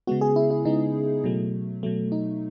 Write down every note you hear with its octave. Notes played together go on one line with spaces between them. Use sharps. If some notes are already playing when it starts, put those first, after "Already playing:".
C#3 G#3 B3 F#4
G#4
E4
E4
C#3 G#3 B3 D#4
B2 F#3 A3
B2 F#3 A3
D#4